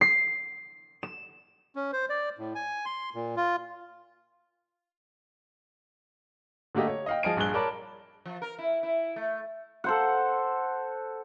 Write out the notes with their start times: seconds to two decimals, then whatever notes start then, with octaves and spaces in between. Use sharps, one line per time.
0.01 C7
1.03 E7
1.76 C#4
1.93 C5
2.10 D5
2.38 A2
2.55 G#5
2.86 C6
3.15 A#2
3.36 F4
6.75 D3 A3 A#3 G4 D#5
6.87 C#5
7.06 D#5 F5 G5
7.23 F3 G#4 D#5 F5 G#5 D7
7.36 A#1 G2 G#4 F#6 G7
7.54 A#4 C#5 D5 A5 B5
8.26 F3
8.42 A#4
8.58 E4
8.83 E4
9.16 A3
9.84 A4 C5 F#5